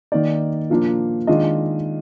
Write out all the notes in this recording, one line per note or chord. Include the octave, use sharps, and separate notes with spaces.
D#3 A#3 D#4 D5
A#2 F3 A#3 D4 F4
D#3 G#3 D4 F4 D#5